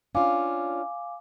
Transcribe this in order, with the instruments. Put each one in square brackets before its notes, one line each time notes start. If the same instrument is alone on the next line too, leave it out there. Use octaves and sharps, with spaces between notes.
[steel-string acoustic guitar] C#4 D4 F4 [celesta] F5 G#5 D6